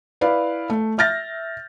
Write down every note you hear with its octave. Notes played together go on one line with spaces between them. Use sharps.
E4 B4 D5 F5
A3
E5 F6 G6 A6 A#6